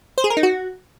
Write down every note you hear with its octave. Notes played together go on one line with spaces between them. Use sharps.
C5
G#4
A#4
D#4
F#4